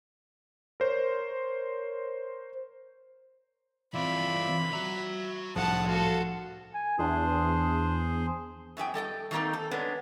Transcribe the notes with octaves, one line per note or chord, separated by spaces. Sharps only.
A#4 C5 C#5
E3 C4 F4 D5 E5 B5
F#4 E5 A#5
C2 A2 F3 A4 F#5 A5 D#6
F#4 A4 F5 A5 C6
G#5
E2 D4 G#4 C5
F#2 E4 G#4 G5
G3 A4 D#5 G5
D#3 F#3 A3 A#3 C4 D#4
A4
G#3 B3 C#4 D4